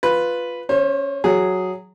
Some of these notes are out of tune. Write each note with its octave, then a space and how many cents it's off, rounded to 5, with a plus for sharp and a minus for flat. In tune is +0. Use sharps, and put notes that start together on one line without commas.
F4 +5 B4 +0
C#4 +5 C5 +35
F#3 +0 G#4 +0